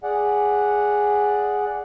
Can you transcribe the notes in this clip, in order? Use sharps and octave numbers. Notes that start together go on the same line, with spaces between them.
G#4 D5 F#5